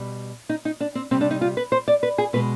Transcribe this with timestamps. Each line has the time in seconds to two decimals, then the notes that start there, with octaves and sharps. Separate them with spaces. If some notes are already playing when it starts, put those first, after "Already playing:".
Already playing: B2 G3
0.49 D#4
0.65 D#4
0.80 D4
0.95 C4
1.11 C3 G3 C4
1.21 D4
1.31 D#4
1.41 F4
1.57 B4
1.72 C5
1.88 D5
2.03 B4
2.18 G#4
2.33 B2 G#3 B4